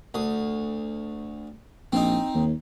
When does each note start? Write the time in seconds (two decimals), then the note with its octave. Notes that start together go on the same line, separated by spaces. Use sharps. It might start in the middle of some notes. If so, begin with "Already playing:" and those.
0.14 D2 D#6
1.93 A#1 C4 D#4
2.35 D#2